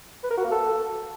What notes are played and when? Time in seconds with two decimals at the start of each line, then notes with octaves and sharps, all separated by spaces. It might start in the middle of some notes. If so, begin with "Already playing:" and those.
0.24 B4
0.31 A#4
0.38 F#4
0.45 A#3
0.51 A4